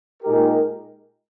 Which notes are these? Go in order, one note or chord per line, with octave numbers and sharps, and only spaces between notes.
A#2 G#3 D#4 G4 A#4